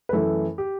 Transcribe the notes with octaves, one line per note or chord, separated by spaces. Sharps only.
B4
F#2 E3 A3 A4
G4